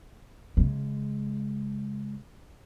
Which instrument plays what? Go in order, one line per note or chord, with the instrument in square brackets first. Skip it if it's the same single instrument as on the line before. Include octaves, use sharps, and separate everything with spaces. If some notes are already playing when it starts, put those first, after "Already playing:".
[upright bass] C#3 G#3